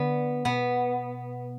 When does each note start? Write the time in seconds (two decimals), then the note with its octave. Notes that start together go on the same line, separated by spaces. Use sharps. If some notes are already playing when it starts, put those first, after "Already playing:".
Already playing: D3 B3
0.45 B2 B3